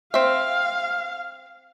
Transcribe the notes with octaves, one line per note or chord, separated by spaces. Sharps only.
C4 E5 F5